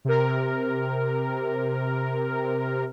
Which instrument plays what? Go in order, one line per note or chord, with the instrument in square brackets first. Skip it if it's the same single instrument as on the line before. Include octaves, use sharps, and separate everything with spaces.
[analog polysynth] C3 A#4